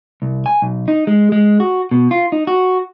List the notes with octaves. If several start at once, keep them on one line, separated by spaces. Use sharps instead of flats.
C2
G#5
B1
D#4
G#3
G#3
F#4
B2
F4
D#4
F#4